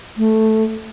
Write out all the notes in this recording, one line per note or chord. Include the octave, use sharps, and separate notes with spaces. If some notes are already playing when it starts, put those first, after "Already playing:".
A3